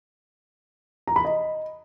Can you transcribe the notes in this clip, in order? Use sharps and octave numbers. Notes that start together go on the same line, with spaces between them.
A#5
B5
D#5